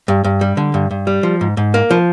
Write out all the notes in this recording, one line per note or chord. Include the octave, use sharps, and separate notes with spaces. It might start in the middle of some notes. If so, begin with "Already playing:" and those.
G2
G2
G3
D3
G2
G2
G3
F3
G#2
G#2
A#3
F3